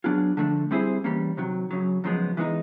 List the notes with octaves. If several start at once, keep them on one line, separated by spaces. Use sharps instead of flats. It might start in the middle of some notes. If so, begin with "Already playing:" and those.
F#3 B3 D4 F4 G#4
D3 F3 A3 D4
G3 C4 E4 G#4 C5
E3 G3 A#3 C#4
C3 D#3 F#3
F#2 C#3 F#3
F#2 C#3 F3 G#3 B3
E3 G#3 B3 D#4